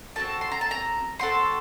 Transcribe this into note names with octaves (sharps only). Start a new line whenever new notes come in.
C4 F#4 A4 A5
C6
A#5
A5
A#5
C4 F#4 A4 C6